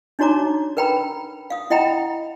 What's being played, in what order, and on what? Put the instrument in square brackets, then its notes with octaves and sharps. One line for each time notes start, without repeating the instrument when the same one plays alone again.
[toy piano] D4 D#4 F#4 C#5 A#5 D6
A#4 B4 G5 A#5 B5
F5 D#6
E4 D#5 F#5 G5 A#5 B5